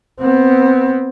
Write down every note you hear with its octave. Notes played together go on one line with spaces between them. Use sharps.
B3 C4